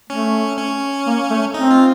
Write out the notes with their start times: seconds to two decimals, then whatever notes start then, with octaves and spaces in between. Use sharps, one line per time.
0.10 A3 C#4
0.58 C#4
1.06 A#3
1.30 A3
1.54 C4 D#4
1.71 F4